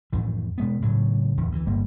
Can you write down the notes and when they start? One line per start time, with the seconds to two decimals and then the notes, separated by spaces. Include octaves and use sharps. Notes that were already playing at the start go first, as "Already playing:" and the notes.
0.13 F2 A2 D#3 E3
0.58 B2 G#3 B3
0.82 A2 C#3 F#3
1.37 D1 E2 E3
1.52 D2 D3 E3
1.67 G1 G3 A#3